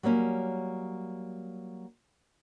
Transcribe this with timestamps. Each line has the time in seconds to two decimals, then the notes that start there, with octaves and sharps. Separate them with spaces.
0.03 F#3 G3 A#3 C#4